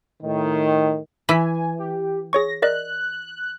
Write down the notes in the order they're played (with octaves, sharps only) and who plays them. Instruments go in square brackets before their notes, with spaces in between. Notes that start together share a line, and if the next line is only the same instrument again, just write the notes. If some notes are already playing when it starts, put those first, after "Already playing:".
[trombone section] A2 D#3
[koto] E3 [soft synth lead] G#5 [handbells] B5 E6 B6
[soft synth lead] G4
[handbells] G#4 C#5 C#6 [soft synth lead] A#6
[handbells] A#4 D5 D#5 [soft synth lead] F#6